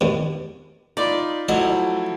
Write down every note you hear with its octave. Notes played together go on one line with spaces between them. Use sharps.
D#2 B2
D#4 F4 D5 B5
F3 F#3 A3 E4 D#5